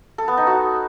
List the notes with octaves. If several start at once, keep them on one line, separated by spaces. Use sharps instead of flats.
A4
B3
D#4
F#4